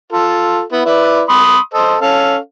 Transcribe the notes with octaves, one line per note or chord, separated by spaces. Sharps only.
F4 A4
B3 E4
E4 B4 D5
B5 C6 D#6
A4 C5 D#5
C#4 A4 F5